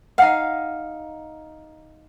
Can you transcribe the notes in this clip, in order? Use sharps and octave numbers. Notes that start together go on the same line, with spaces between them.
D#4 F5 F#5